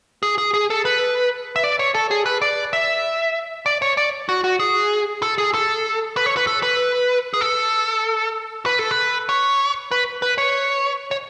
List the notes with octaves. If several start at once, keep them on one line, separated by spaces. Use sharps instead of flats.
G#4
G#4
G#4
A4
B4
E5
D5
C#5
A4
G#4
B4
D5
E5
D5
C#5
D5
F#4
F#4
G#4
A4
G#4
A4
B4
C#5
B4
A4
B4
G#4
A4
B4
A4
B4
C#5
B4
B4
C#5
C#5